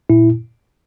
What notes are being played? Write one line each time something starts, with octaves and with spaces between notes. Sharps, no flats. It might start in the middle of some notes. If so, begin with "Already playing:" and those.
A#2 E4